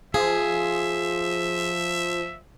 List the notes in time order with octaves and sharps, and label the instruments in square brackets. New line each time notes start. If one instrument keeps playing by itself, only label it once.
[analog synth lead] F3 [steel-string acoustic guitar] G#4 [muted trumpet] E5